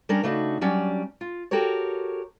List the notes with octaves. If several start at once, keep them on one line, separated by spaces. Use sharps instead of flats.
G3 C#4 D4 A#4
C#3 A3 D4 D#4 F#4
F#3 G3 C#4 D4 D5
F4
F#4 G4 A4 A#4 C#5